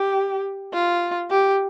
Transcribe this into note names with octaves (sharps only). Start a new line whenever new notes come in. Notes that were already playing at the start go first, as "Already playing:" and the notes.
Already playing: G4
F4
G4